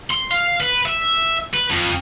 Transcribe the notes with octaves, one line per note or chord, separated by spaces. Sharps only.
C6
F5
B4
E5
B4
F2